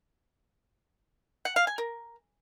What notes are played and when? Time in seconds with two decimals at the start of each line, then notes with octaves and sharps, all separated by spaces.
1.45 F#5
1.56 F5
1.67 G#5
1.78 A#4